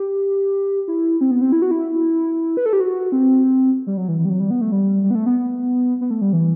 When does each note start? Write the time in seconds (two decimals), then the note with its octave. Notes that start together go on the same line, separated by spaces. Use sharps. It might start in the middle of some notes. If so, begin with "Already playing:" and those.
Already playing: G4
0.88 E4
1.21 C4
1.31 B3
1.41 C4
1.52 E4
1.62 F#4
1.71 E4
2.57 B4
2.66 A4
2.73 G4
2.80 F#4
3.12 C4
3.87 G3
3.97 F#3
4.08 E3
4.19 E3
4.25 G3
4.30 F#3
4.40 G3
4.50 B3
4.61 A3
4.72 G3
5.04 G3
5.11 B3
5.15 A3
5.26 B3
6.01 B3
6.10 A3
6.21 G3
6.33 E3